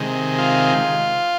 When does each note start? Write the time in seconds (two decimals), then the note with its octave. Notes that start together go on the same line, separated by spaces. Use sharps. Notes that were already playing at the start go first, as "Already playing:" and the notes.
Already playing: C3 D#3 G#3
0.38 F4